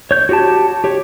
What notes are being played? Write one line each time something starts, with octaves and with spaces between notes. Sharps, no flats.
C#5 G6
F#4 G4 A5
G4 C#5